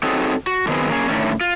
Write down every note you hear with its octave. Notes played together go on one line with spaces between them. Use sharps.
C4 D#4 F#4 G#4 A4 C#5
F#4
D3 D#3 F#3 B3 C4 G#4
A#3 C#4 G#4
A2 D3 D#3 A3 C#4
F4